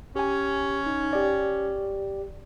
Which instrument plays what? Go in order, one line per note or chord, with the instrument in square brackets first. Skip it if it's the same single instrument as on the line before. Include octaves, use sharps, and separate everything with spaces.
[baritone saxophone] C#4 [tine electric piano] G4 G#5
[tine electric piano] D#4
G4 D5